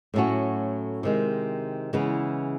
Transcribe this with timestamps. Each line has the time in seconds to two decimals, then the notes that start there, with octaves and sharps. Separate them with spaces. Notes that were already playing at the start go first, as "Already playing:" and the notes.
0.14 A2 F#3 A3 C#4 F#4
1.03 C3 D#3 G#3
1.93 C#3 E3 G#3 B3 E4